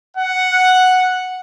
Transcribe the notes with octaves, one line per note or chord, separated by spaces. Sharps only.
F#5